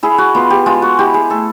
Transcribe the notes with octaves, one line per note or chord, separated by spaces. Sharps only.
E4 G#4
F#4
B3 F4
G4
G#3 F4
F#4
E4 G4
G#4
A3 A4